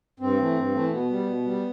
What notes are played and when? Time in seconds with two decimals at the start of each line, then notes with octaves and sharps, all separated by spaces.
0.20 G2 C4
0.38 E3 A3
0.56 G2
0.74 E3 A3
0.91 B2 B3
1.10 G3
1.28 B2
1.45 G3